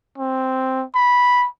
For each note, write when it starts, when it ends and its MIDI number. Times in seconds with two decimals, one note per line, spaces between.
0.18 0.84 60
0.95 1.47 83